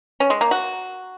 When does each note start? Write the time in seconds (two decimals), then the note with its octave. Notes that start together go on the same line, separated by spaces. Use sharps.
0.20 C#4
0.30 G#3
0.41 A#3
0.51 F#4